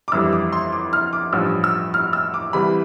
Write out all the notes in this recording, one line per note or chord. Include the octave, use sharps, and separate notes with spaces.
D6
G1 F2 E3 G3 E6
D6
C6
D6
F6
D6
A1 G2 F3 E6
E6
F6
E6
D6
C2 C3 E3 G3 B5